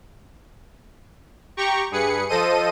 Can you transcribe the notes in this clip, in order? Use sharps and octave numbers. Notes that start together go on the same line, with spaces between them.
G4 G5 A#5 C#6
G2 G#4 B4 C#7
F3 A4 C5 D#5 D#7